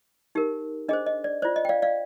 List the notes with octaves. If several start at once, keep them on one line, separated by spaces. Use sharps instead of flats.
D#4 G4 A#4
D4 G#4 C5 D#5
D#5
D5
F4 C5 D5
D#5
G5
D5 F5
D5 F5